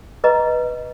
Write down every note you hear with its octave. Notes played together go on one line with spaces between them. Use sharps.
B4 D#5 A#5